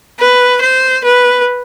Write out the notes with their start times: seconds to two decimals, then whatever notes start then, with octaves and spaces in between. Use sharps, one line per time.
0.19 B4
0.61 C5
1.04 B4